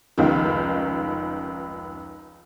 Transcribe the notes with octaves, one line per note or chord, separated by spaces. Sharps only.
F1 C#2 D#3